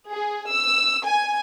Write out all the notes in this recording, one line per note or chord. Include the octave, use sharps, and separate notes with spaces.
G#4
E6
G#5